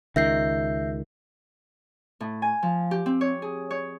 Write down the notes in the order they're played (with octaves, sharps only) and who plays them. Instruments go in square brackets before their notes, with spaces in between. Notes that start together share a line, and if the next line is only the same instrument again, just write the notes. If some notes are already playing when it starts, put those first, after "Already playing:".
[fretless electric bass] C#2 D#3 [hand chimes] E5 G6 C7
[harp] A2
G#5
F3
G4
C4
C#5
G#4
C#5